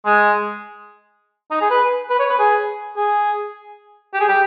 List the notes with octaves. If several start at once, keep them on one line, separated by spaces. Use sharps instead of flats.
G#3
D#4
G#4
B4
B4
C#5
B4
G#4
G#4
G4
G#4
G4